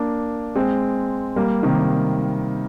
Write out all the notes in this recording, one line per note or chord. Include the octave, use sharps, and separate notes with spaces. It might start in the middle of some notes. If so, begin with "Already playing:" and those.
Already playing: A#3 D4
G#3 C4
G3 A#3
C3 D#3